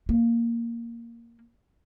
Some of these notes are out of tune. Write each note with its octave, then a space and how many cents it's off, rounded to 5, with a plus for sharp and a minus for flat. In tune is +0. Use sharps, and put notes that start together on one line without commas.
A#3 -5